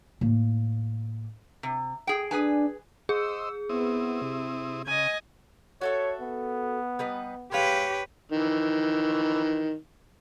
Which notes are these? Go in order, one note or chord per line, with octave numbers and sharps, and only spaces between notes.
A2 A#3
C3
G#4 G5
D4 G#4 B4 G#5
G#4 C5 D#5 E6
B3 C4 E4 D#6
C3
C#3 D#5 G#5
F#4 A4 C#5 E5
B3
G3 D#4 B4
G#3 G4 B4 C#5 F5
D#3 E3